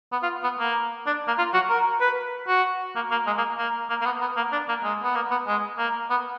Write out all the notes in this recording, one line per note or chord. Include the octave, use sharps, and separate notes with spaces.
B3
F4
B3
A#3
D4
A#3
F4
F#4
A#4
B4
F#4
A#3
A#3
G#3
A#3
A#3
A#3
A#3
B3
B3
A#3
D4
A#3
G#3
B3
A#3
B3
G#3
A#3
B3